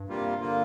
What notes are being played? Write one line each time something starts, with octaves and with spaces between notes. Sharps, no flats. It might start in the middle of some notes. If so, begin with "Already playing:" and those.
Already playing: G2
C3 G3 A#3 F4
D3 A#3 F4